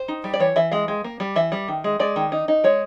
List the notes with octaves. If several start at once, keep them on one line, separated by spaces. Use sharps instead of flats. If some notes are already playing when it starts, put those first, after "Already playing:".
Already playing: C5
D#4
G3
D5
E3 C#5
E3 E5
G#3 F5
G#3
A#3
G3
E3 E5
G3
D#3
G#3
G#3 D5
D#3
D#4
D#4
G#3 C#5